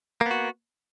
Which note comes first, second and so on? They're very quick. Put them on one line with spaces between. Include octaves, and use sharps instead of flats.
A#3 B3 F#4